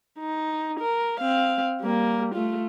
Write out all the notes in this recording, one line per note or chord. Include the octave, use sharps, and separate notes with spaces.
D#4
A#4
C4 F5
G3 A#3
A3 F4